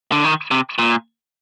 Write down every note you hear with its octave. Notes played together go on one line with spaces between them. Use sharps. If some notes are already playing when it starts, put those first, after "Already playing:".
D3
D#3
C3
A#2